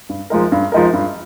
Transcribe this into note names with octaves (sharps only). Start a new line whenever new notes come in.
G2
F3 G#3 D#4 A#4
G2
F3 G#3 D#4 A#4
G2